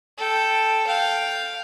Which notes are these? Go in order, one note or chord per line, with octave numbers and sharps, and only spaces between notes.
A4 G5
F5 G5